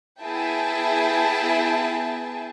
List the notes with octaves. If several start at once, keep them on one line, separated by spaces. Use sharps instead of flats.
B3 E4 G#4 E5 G5 A5